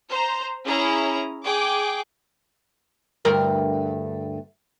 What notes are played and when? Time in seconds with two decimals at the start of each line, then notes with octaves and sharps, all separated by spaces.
0.11 C5 A#5
0.65 C#4 E4 G#4 A#5
1.45 G#4 G5 D6
3.25 D2 G2 A#4